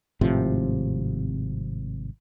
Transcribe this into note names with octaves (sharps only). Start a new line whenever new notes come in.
G#1 A2 C3 F3